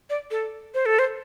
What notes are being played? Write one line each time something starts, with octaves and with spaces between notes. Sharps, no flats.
D5
A4
C5
A4
C5